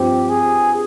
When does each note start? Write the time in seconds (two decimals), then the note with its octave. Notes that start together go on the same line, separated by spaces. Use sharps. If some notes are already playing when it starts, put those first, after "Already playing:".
Already playing: G2 F3 C4 F4 G4 C5
0.29 G#4